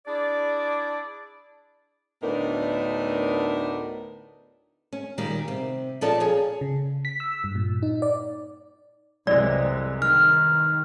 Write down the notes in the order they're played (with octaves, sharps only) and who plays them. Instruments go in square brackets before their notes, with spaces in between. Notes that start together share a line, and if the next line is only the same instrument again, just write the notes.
[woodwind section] D4 E4 G#4 D5
[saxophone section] D2 A2 B3 D4 D#4 A#4
[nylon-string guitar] C#4
A#2 D#3 G3 A#3
C3
A#2 F3 C#4 A4 D5 A5
G#4 C#5
[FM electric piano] C#3
B6
E6
G2
A#2
D#4
D5
[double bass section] C2 [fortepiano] F#2 E3 G#3 [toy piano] D5
[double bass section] D#3 [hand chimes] F6